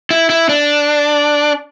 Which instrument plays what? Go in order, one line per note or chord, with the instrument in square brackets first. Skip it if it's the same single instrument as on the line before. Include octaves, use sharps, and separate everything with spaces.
[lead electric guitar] E4
E4
D4